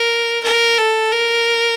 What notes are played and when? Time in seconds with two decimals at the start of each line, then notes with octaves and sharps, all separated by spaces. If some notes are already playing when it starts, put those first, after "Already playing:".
Already playing: A#4
0.44 A#4
0.78 A4
1.12 A#4